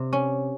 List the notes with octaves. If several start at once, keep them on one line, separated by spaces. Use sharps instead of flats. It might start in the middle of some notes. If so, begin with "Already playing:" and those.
Already playing: C3
C#4